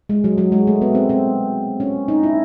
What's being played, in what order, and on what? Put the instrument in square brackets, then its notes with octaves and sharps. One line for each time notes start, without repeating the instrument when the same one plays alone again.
[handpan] G#3
F#3
F#3
G#3
A3
B3
C4
C4
C#4
D#4
E4